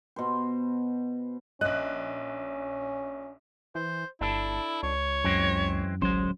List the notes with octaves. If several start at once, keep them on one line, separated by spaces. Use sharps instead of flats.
B2 C5
A#1 C#4 D#5 F#6
E3 C5
G1 D4 E4 A4
C#2 C#5
F#2 E3 G#3 C4
D1 A1 F#3 G#3 C#4 C5